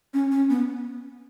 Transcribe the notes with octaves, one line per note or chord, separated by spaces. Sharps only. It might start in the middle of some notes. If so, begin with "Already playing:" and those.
C#4
C#4
B3